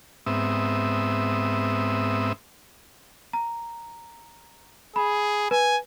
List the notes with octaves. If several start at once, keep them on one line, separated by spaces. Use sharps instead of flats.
G#2 B3 C4 E5 D#6
A#5
G#4 B5
B4 G#5